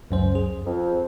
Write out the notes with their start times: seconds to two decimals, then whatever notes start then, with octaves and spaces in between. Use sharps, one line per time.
0.11 C#2 F#2 C5
0.35 G#4
0.65 F2